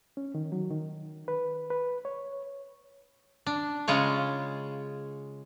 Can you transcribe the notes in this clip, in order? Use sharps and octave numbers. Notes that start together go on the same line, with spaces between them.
C#4
D#3
F#3
D#3
B4
B4
C#5
D4
C#3 G#3 F4 C#5